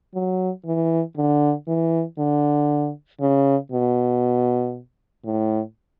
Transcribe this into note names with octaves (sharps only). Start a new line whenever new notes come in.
F#3
E3
D3
E3
D3
C#3
B2
A2